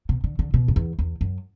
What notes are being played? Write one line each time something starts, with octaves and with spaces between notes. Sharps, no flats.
B2
D3
D3
B2
F#2
E2
E2
F#2